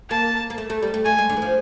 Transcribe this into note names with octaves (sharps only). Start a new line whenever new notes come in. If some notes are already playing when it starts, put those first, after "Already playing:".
A#3 A5
A#3
A3
A3
G3
A3
A3 G#5
G#3
D3
E3
F3